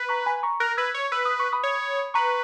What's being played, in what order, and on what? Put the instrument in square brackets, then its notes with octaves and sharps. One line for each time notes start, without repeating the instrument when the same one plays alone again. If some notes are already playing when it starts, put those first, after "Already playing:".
Already playing: [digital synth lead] B4
[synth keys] A#5 C#6
G#5 B5
A#5 C#6
[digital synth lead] A#4 [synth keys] F#6 A#6
[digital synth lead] B4 [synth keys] E6 G#6
[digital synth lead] C#5
[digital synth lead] B4 [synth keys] E6
[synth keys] D#6
C#6
B5 D#6
[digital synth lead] C#5
[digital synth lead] B4 [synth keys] A#5 C#6